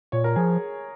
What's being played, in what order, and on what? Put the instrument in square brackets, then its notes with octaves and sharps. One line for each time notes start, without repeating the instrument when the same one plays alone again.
[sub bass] A#2 [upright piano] C#5
[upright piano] A#4
[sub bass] F3 [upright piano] G#4